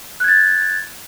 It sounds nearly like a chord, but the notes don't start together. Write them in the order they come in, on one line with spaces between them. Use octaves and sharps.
F#6 G#6 A6